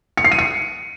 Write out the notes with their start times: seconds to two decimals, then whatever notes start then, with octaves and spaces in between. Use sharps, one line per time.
0.17 C#7
0.25 C7
0.32 D#7
0.39 C#7